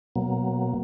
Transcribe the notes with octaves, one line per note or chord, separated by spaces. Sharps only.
B2 F#3 A#3